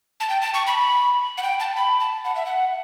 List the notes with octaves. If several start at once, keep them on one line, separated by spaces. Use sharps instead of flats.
A5
G5
A5
C#6
B5
F#5
G5
A5
B5
A5
F#5
E5
F#5